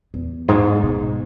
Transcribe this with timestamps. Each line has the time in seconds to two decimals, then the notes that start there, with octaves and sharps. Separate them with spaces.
0.14 E2
0.48 G#2
0.83 B2
1.00 D#3